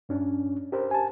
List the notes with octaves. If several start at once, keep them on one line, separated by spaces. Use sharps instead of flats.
G2 C#4 D4
G4 A#4 C5
G#5 A5